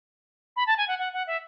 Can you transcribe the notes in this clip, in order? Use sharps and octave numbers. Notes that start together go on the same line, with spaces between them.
B5
A5
G#5
F#5
F#5
F#5
E5